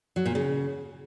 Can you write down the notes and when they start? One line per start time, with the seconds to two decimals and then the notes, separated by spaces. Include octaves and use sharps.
0.16 F#3
0.26 A#2
0.35 C#3